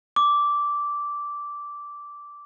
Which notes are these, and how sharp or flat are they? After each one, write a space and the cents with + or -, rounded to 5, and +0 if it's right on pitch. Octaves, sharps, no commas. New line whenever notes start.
D6 -10